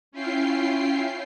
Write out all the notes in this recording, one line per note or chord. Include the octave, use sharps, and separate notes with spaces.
C#4 E4 F4 G5 C7